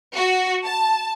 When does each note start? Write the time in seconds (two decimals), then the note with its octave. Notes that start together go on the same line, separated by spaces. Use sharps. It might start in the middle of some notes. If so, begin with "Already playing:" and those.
0.14 F#4
0.66 A5